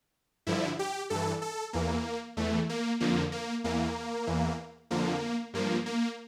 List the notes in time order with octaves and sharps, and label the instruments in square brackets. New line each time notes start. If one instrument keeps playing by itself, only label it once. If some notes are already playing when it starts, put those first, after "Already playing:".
[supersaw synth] G2 D3 F3 E4
G4
G2 E3 A4
A4
E2 E3 A#3
E2 E3 A3
A#3
F2 D3 F3 A#3
A#3
E2 E3 A#3
E2 E3
F2 D3 F3 A#3
G2 F3 A#3
A#3